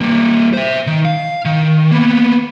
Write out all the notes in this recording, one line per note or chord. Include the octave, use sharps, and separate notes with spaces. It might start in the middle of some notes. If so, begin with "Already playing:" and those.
G3 A#3
C5 E5
D#3
F5
D#3
A#3 B3